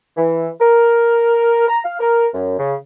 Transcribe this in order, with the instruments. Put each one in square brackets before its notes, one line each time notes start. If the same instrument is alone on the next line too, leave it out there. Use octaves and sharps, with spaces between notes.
[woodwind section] E3
A#4
A#5
F5
A#4
F#2
C#3